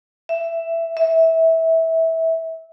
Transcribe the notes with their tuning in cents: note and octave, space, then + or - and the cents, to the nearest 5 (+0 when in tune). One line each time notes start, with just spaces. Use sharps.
E5 +10
E5 -20